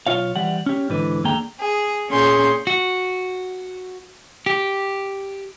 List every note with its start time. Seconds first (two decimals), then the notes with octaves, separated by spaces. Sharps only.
0.07 B1 F4 C#5 F5
0.36 E3 G3 F#5
0.66 C#4 G4
0.89 G#2 D3 E3 B4
1.24 E2 D3 A#3 G#4 G5 A#5
1.59 G#4
2.09 A#2 C#4 G#4 C6 G6
2.67 F#4
4.46 G4